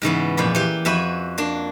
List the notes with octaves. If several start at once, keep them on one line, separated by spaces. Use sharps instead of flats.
G#2 C#3 E3 B3
F2 A#2 D5 B5
E3 G4
F2 F#4 E5 G#5 B5
A#3 D4